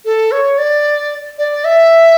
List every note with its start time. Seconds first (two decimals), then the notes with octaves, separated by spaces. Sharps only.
0.05 A4
0.32 C#5
0.58 D5
1.38 D5
1.65 E5